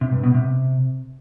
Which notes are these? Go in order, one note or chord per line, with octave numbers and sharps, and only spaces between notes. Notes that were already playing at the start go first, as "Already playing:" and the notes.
C3
G2
B2
C3